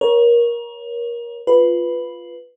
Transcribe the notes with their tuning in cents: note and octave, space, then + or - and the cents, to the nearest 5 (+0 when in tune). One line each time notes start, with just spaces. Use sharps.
A#4 +25 C#5 +0
F4 +0 B4 +0